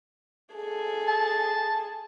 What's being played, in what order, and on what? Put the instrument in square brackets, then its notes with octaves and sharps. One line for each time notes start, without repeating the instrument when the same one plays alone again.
[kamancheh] G#4 A4
[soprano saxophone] A5